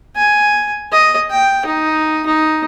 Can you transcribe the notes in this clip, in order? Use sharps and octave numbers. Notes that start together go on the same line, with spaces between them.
G#5
D#5
G5
D#4
D#4